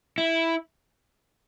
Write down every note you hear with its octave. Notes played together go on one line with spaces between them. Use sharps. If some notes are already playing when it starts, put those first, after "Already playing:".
E4